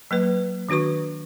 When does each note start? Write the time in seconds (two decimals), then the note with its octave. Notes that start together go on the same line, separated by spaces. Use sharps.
0.11 F#3 A#3 B4
0.69 D#3 D4 F#4 B4 C#6